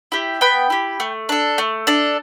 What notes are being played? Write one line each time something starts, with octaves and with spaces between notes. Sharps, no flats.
E4 G4
B3 G5 B5
E4 G4
A3
D4 A4
A3
D4 A4